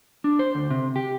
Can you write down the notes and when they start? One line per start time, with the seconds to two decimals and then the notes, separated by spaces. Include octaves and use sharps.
0.24 D4
0.39 C5
0.55 D2
0.70 C3
0.96 G4